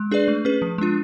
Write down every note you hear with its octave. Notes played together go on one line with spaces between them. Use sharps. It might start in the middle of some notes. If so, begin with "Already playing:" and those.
Already playing: G#3
D4 G#4 B4 D5
A3
C#4 G#4 B4
F3
G#3 D4 F4